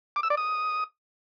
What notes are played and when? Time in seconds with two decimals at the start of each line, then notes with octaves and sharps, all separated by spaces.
0.16 D6
0.23 E6
0.30 D5
0.37 D#6